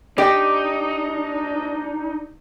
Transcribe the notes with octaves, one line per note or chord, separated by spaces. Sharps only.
D4 D#4 G4 D5 G5